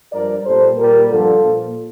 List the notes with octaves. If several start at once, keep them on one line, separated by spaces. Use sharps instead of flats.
G2 F3 A#4 D5
A#2 G3 A4 C5
A#2 G3 G4 A#4
G2 D3 F3 F4 A4
A#2 F3